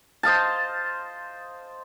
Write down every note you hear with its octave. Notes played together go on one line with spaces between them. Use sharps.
C5 D#5 F5 A5